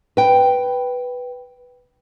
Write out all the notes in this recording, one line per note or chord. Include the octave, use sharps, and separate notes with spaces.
B4 G5